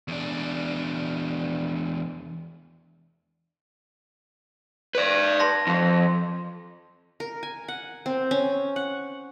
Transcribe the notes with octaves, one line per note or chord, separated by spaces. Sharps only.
E2 D4
B4 D5
A5 C6 A#6
F2
A#4
G#5
F#5
C4
C#4
F#5